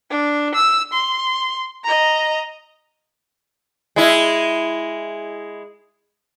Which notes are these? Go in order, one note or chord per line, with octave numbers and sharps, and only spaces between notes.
D4
E6
C6
D#5 A#5
G#3 E4